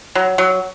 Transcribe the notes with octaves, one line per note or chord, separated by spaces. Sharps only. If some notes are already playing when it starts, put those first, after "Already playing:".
F#3
F#3